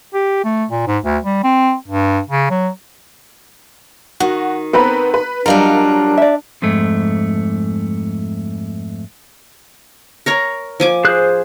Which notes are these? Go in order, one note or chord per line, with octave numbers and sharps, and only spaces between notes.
G4
A3
A#2
G#2
D2
G3
C4
G2
C#3
F#3
D#3 F#4
B3 C4 A4 B4 A#5 B5
B4
F#3 G3 D4 F4 A#4 D#5 F5
D5 E5
F2 G#2 A3
A#4 C#5 A#5
F3 G#5 D6
G#4 C5 F#6